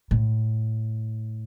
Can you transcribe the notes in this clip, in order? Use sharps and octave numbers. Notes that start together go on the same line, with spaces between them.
A2